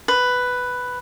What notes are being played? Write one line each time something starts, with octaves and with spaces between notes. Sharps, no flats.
B4